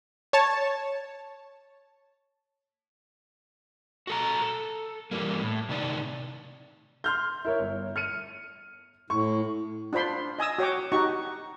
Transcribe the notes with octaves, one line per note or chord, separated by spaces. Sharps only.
C#5 A5
F#4 A4 A#5
A4
E3 G3 A#3
A2
C3 D#3 D5
C6 F6 G6
E4 A#4 C#5
G1
F6 C#7 D#7
A2 C#6
D4 F4 C5 B5 C6
D#5 G#5 D#6 E6
F#4 C#5 G5 D6
D#4 F#4 G4 C#6